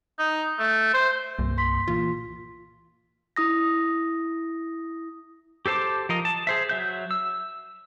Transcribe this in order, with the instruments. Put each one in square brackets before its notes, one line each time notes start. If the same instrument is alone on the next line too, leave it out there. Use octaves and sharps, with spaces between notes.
[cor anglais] D#4
A3
C5
[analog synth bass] C2 [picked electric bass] G2 A#3
[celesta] C6 B6
[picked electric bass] A#2 E3 A#3 [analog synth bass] F4
[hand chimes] E4 D#6 A#6
[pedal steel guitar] G4 A4 C5 A5 D6
F3 A#4 D#5
A5
G#4 C5 E5
F#3 E5 G6
E6